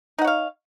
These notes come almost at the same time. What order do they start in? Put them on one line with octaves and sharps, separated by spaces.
D#4 F#5 C#5 F5